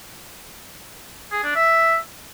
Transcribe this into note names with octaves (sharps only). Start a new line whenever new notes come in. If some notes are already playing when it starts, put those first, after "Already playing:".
G#4
D4
E5